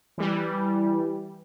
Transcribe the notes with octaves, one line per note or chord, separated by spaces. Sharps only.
E3 G3